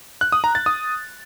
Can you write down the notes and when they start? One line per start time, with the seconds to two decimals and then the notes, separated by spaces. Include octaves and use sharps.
0.21 F#6
0.32 D#6
0.44 A#5
0.55 A6
0.66 D#6